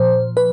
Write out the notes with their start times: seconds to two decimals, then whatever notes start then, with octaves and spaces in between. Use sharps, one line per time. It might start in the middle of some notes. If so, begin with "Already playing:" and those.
Already playing: A#2 F3 C5
0.37 B4